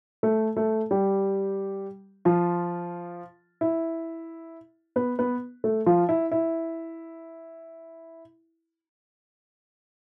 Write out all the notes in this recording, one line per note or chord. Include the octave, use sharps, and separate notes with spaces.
A3 A4
A3 A4
G3 G4
F3 F4
E4
B3 B4
B3 B4
A3 A4
F3 F4
E4
E4